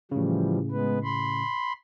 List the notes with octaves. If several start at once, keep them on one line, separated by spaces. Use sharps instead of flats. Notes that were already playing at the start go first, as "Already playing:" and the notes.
A2 C#3 E3 F3 G3
G#3 B3 B4
B5 C6